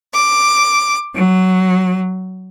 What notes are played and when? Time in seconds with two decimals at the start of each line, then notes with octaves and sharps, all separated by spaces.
0.14 D6
1.15 F#3